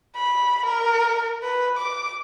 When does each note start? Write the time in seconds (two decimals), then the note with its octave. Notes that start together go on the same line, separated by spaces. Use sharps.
0.16 B5
0.66 A#4
1.43 B4
1.78 D6